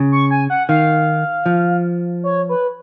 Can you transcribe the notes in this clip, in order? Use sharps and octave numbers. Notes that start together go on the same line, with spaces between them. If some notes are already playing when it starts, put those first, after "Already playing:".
Already playing: C#3
C#6
G#5
F#5
D#3 F5
F3
C#5
B4